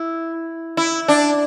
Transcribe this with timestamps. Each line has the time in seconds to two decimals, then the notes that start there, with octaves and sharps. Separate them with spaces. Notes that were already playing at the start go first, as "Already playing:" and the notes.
Already playing: E4
0.77 E4
1.08 D4